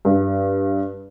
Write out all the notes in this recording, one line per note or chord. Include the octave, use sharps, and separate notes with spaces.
G2